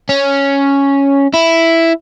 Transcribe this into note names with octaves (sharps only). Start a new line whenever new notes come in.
C#4
E4